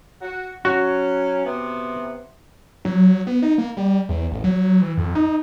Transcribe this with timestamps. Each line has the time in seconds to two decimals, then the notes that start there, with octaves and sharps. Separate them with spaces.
0.22 F#4
0.65 F#3 C#4 F#4
1.45 C3 B3
2.85 F#3
3.27 B3
3.42 D#4
3.58 A#3
3.77 G3
4.09 E2
4.32 A1
4.44 F#3
4.82 E3
4.97 F2
5.15 D#4